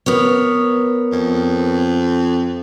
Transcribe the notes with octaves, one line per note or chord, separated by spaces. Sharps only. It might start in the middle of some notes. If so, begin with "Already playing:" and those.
B3 A#4 C#5
F2